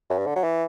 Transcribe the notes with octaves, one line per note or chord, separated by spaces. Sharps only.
F#2
G2
D3
F#3
E3